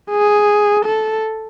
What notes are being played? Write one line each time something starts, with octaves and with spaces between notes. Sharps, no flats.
G#4
A4